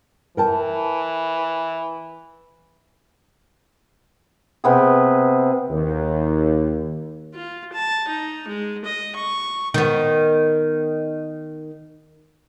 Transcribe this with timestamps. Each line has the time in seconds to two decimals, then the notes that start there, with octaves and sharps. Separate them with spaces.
0.37 E3 A#4 G5 A5
4.64 C3 B3 G#4
5.70 D#2
7.34 F4
7.73 A5
8.08 D#4
8.47 G#3
8.84 D#5
9.15 C#6
9.74 D#3 B3